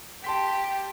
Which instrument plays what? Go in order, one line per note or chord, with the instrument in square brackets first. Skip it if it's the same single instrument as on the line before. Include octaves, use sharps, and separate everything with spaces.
[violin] G4 [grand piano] A5 C6 B6